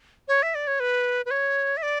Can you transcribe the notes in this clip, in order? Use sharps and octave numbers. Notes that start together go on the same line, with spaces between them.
C#5
E5
D5
C#5
B4
B4
C#5
E5
D5